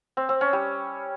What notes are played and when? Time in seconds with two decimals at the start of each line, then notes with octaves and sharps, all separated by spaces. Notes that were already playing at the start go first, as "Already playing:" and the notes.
0.17 C4
0.29 C4
0.41 C#4
0.53 G3